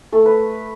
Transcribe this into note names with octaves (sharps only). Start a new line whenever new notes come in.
A3 A4
B4